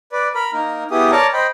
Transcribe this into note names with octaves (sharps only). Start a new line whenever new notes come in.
B4 D5
A#4 B5
A#3 D#4 A#4
B3 E4 G4 G#4 D#6
A#4 C#5 D5 A5 A#5
C5 D#5 G5 B5